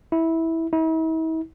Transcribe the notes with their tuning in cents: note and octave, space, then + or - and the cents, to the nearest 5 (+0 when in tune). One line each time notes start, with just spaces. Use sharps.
E4 -15
E4 -45